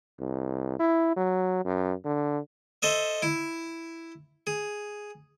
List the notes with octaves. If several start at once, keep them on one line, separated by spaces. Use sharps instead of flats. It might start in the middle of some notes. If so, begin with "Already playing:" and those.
C2
E4
F#3
F#2
D3
A4 C5 D#5 E5
E4
G#4